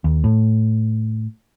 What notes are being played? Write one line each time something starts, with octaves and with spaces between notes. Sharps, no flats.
D#2
A2